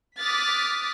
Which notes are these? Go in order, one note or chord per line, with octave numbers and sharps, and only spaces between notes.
D6 D#6 F6 F#6 A6 B6